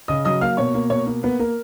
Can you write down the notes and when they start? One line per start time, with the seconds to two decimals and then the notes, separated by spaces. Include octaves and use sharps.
0.08 C#3 D#5 D#6
0.25 F#3 D#5 D#6
0.41 A#3 F5 F6
0.57 B2 C#5 C#6
0.74 A#3
0.90 B2 C#5 C#6
1.07 A#3
1.23 A#3 B3 B4
1.39 A#3 A#4